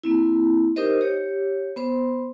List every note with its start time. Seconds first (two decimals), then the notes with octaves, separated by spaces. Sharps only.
0.04 A#3 C4 E4
0.76 D#4 G4 A#4 C5 D#5
1.01 G4 C#5
1.76 B3 C5 C6